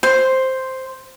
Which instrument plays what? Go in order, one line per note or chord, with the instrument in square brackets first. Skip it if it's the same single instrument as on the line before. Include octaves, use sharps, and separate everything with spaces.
[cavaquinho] C5